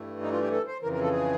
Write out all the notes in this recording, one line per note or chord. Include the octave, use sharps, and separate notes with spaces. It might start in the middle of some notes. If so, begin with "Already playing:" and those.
Already playing: G2 E3 A3
D#4
F4
G4
A4
C5
F2 C#3 E3 A#4
A#4
A4
G#4